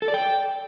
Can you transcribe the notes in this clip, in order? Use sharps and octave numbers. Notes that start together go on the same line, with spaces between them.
A4
D5
G5